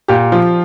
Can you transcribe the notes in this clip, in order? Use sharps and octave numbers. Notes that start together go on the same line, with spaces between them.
A#2 G4
F3 F4